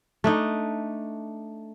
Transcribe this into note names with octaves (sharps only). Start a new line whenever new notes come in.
A3 D4 D#4